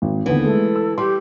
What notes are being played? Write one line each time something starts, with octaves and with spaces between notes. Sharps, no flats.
G#1
D#2 D3 E3 B3
G#3 A3 A4
E6
G3 G4 C6